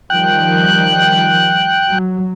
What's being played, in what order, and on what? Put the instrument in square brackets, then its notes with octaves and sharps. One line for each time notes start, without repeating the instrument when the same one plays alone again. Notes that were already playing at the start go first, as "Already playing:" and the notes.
[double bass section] D#3 F3 G3 [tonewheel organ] G5 F#6
[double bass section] F#3